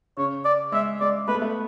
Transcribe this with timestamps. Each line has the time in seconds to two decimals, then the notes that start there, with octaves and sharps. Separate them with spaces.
0.17 C#3 C#5
0.45 D5
0.72 G#3 E5
1.00 G#3 D5
1.28 A3 B4
1.35 B3
1.42 A3